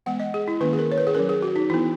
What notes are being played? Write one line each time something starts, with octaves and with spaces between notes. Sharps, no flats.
E3 G#3 B3 F#5
D#5
G#4
E4
D#3 A#3 C#4 B4
G#4
A#4
C#5
B4
G#4
F#3 C#4 A#4
G#4
F#4
D#4
E3 B3 E4